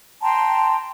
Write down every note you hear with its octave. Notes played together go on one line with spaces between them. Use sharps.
G5 A5 A#5 C6